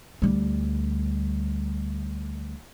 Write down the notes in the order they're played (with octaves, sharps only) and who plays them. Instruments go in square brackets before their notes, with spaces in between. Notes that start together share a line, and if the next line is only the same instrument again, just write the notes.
[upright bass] D2 G3